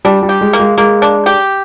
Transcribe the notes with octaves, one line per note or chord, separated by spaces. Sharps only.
G3 D4
G3
G4
G#3
A#3
G#3
G#3 A#3
D4
G4